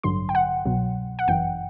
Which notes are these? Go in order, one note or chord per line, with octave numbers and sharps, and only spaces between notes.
A1 G2 D3 F#3 C6
G5
F#5
C2 B2 F#3
F#5
G1 F#2 E3 G5